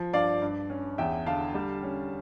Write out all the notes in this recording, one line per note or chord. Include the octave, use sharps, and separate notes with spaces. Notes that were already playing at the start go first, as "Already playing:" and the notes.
Already playing: F3
G2 D5 F5
G2
C#4
E2 E5 G5
D3 F5 A5
G3
C#4